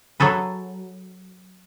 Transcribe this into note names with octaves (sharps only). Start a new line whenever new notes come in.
F#3 G#4 A4 B4